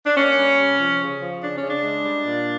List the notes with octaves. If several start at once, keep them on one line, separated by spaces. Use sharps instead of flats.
D4
A#3 C#4
G3
C3
F3
C#3
F3
C#3 D4
C#4
C#3
D4
G#3
G3
A#2